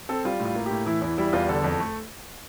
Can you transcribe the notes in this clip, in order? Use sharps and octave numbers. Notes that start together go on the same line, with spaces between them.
C4 A4
G3 F4
A2
F4
A#3
A2 G4
E3 E4
E2 E4
G3 E4
E2 F4
D3 A4
F2
A3